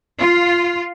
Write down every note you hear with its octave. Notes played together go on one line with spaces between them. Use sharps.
F4